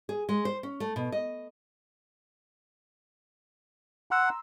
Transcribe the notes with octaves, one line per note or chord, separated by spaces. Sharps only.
G#4
G#3
C5
C#4
A3
B2
D#5
F#5 A#5 C6 E6